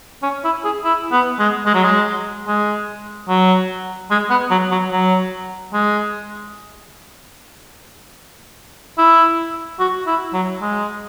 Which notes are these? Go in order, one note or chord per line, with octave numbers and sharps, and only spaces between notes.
C#4
E4
G#4
E4
B3
G#3
G#3
F#3
G#3
G#3
F#3
G#3
B3
F#3
F#3
F#3
G#3
E4
F#4
E4
F#3
G#3